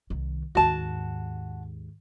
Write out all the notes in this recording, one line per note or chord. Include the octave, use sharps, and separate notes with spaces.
C2 D#3
D#2 G#2 F#4 A5